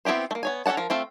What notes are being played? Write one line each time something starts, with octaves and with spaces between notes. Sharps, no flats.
B3 C4 E4 G4 C5
A3 A#3
B3 C#5 G#5
C#4 A4 D5 F#5 A5
F3 A#4
A3 C4 F4 E5